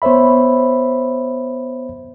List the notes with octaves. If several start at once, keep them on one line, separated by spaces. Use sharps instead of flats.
B3 C5 C#5 E5 B5